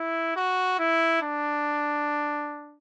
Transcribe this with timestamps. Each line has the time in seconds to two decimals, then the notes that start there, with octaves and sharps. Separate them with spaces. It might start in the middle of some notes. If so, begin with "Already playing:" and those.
Already playing: E4
0.36 F#4
0.79 E4
1.22 D4